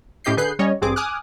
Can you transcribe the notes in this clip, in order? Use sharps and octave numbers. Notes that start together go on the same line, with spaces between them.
A2 C#4 G4 D#5 G6 C7
D3 G#4 B4 F#6 G6 C7
G3 C#4 C#5 D#5
A1 G2 C4 G#4 D6
G#5 D6 D#6 F6 F#6